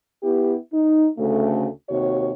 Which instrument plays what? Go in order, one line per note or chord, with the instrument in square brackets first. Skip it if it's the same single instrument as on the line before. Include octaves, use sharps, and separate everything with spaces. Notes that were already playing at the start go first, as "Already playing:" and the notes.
[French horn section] B3 E4 G4
D#4
D2 C#3 A3
D#2 C3 F#4 C#5